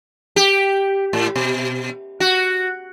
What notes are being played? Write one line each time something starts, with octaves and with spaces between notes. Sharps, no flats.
G4
A2
B2
F#4